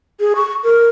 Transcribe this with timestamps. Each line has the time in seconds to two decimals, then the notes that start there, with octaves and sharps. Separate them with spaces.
0.20 G#4
0.36 C#6
0.64 A#4